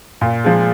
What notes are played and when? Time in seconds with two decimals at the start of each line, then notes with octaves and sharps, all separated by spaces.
0.21 A#2
0.44 F3 G#3